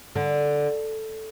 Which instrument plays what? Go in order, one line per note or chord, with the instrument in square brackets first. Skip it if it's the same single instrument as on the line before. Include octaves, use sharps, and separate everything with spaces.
[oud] D3